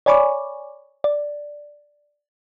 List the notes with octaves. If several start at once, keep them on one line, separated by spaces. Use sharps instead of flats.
C#5 D5 G#5 B5 C#6 D6
D5